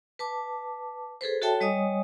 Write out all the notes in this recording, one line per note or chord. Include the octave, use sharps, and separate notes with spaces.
B4 A5 D6
G#4 A4 B4 C5
F#4 A4 C#5 E5 G5 A5
G3 C#5 D#5 G#5 D#6